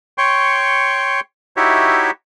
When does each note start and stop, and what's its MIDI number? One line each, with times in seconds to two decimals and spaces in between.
0.18 1.20 73
0.18 1.20 79
0.18 1.20 84
0.18 1.20 85
1.57 2.11 63
1.57 2.11 64
1.57 2.11 66
1.57 2.11 67
1.57 2.11 73
1.57 2.11 76